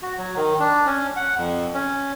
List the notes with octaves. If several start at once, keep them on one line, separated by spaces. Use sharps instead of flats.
F#4
F#3
D#3
D4
C#4
F#5
F2
C#4